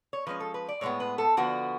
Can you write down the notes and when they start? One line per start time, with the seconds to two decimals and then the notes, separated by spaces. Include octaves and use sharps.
0.13 C#5
0.27 F3 G#3 C#4 B4
0.40 A4
0.54 B4
0.69 D5
0.81 A2 G#3 B3 C#5
1.00 B4
1.18 A4
1.37 D3 F3 B3 F#4